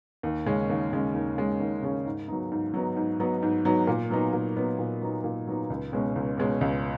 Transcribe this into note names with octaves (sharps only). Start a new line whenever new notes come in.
D#2
C#3 G#3 C#4
D#2
C#3 G#3 C#4
D#2
C#3 G#3 C#4
D#2
C#3 G#3 C#4
G#2
F#3 B3 D#4
G#2
F#3 B3 D#4
G#2
F#3 B3 D#4
G#2
F#3 B3 D#4
A#2
F#3 B3 D#4
A#2
F#3 B3 D#4
A#2
F#3 B3 D#4
A#2
F#3 B3 D#4
C#2
B2 G#3 C#4
C#2
B2 G#3 C#4
C#2